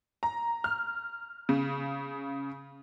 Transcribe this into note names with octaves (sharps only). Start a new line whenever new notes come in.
A#5
F6
C#3